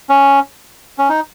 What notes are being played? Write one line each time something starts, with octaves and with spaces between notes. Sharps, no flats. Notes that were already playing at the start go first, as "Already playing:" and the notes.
C#4
C#4
D#4